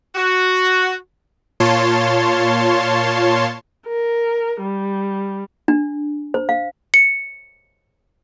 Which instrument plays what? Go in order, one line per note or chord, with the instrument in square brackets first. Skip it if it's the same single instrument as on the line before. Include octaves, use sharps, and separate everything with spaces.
[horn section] F#4
[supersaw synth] A#2 F4 C#5 A5 C6
[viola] A#4
G3
[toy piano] D4
C5
F5
[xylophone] C#7